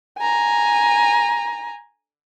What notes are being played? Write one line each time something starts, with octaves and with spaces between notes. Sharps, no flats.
G#5 A#5